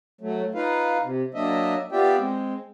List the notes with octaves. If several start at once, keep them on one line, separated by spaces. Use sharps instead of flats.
F#3 A3
D#4 F4 B4 F5
C3
F#3 A#3 D4 D#5 E5
B3 F4 G4 D5 E5 G5
G#3 C4